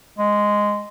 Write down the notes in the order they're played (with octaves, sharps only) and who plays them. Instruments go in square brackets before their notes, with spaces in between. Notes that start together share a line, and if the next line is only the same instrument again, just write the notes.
[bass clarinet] G#3